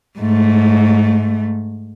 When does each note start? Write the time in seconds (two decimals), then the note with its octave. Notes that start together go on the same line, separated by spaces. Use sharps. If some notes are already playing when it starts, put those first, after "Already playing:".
0.18 G#2 A3